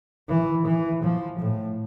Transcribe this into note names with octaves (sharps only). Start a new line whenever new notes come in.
E3
E3
F3
A2